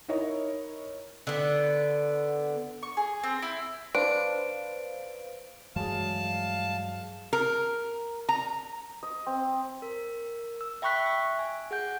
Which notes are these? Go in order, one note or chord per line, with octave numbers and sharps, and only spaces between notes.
D#4 E4 A#4 C#5 D#5
D3 B3
C#6
G#4
C4
E4
D4 B4 C5 F5 D7
G2 E3 F#3 G#3 G#4 F5 A5
A#4
A#5
D#5
C4
A#4
E6
E5 G5 B5 C#6 F#6 B6
E5
G#5
G#4 F#5 G6